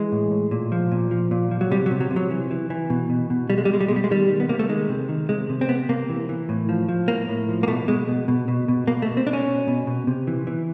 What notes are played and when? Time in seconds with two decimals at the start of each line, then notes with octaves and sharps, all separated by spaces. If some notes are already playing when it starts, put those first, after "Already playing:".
Already playing: E3 G#3
0.12 A2
0.31 A2
0.51 A#2
0.72 F3
0.92 A#2
1.11 F3
1.31 A#2
1.51 F3
1.61 F#3
1.71 C3 G3
1.86 F#3
1.91 C3
2.00 F#3
2.10 C3
2.16 F#3
2.31 E3
2.51 E3
2.70 E3
2.90 B2
3.10 B2
3.30 B2
3.50 B2 G3
3.58 G#3
3.65 G3
3.69 B2 G#3
3.81 G3
3.88 B2 G#3
3.96 G3
4.04 G#3
4.11 D#3 G3
4.30 D#3
4.40 B3
4.49 C3 A#3
4.59 A3
4.69 D#3 G#3
4.89 C3
5.09 D#3
5.29 C3 G#3
5.49 C3
5.61 C4
5.68 C3 B3
5.89 C3 A#3
6.10 E3
6.29 E3
6.49 A2
6.69 F3
6.89 F3
7.08 A2 A#3
7.29 A2
7.49 F3
7.63 A#3
7.68 B2 A3
7.88 B2 G#3
8.08 B2
8.28 B2
8.48 B2
8.68 B2
8.87 B2 A#3
9.02 A3
9.07 B2
9.17 C4
9.27 B2 D4
9.33 C#4
9.47 B2
9.67 B2
9.87 B2
10.07 C3
10.27 E3
10.47 E3